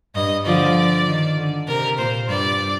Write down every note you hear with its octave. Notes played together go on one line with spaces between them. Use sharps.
G2 D#5
D3 F3 D5
D#3
D3
C3 A#4
A#2 C5
G2 D5